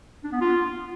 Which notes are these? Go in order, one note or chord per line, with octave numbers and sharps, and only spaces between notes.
D4
B3
F4